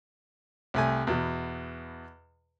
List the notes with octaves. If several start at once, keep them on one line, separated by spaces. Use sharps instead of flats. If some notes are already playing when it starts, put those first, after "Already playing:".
C2 A3 G#5
E2 B2